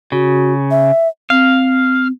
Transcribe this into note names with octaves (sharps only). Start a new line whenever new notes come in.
C#3 F#4
E5
C4 F5